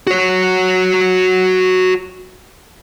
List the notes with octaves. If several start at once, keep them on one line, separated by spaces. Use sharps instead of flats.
F#4 C#5